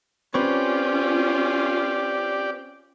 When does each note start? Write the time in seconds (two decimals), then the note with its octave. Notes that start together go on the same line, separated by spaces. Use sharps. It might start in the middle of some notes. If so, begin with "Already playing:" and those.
0.34 C4 C#4 F4 G4 B4 C#5 D5 F5